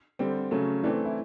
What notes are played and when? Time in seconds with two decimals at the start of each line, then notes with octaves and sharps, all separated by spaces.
0.19 D3 G3 C4
0.51 C#3 F#3 A3 C#4
0.84 E3 A3 C4 D4
1.05 E4